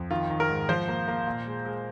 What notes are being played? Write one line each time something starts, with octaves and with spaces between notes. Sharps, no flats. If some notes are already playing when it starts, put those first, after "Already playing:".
Already playing: F2
D#3 F4
D#3
A#4
G#2
F3 C5
A#3
A#3
A#2
G#3
G#3